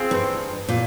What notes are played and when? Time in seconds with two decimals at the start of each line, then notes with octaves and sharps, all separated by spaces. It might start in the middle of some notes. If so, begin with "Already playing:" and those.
Already playing: C4 F4 G#4
0.11 G2
0.69 A#2